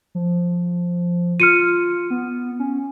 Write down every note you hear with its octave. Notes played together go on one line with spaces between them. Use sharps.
F3
F4 F6 C#7 D#7
B3
C#4